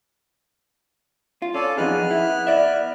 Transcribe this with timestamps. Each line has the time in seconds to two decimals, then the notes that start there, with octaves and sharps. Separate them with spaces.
1.42 F4
1.54 C#4 F4 A4 D5
1.77 F2 B3 D#4 G#4 F6 F#6
2.11 E4
2.47 D5 E5